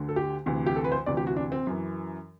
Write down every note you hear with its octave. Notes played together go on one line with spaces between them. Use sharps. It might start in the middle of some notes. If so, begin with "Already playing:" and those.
Already playing: D2 D3
A4
G4
D2 C3 E3
G4
A4
B4
C5
D2 C3 E3 D5
G4
F#4
D4
C4
F#2 E3